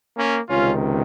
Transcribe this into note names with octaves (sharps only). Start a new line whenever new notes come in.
A#3 C#4
C#2 C3 D#3 C#4 F4